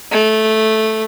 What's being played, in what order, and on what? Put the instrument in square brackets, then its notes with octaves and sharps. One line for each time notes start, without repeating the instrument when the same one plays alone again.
[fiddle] A3